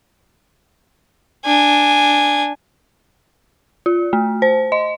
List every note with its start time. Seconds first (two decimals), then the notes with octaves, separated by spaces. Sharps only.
1.46 D4 G#5
3.86 F4
4.13 A3
4.42 C5
4.72 D#5